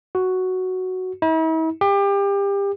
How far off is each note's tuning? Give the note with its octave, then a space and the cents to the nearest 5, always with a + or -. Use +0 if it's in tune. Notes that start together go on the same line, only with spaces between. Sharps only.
F#4 +5
E4 -45
G4 +30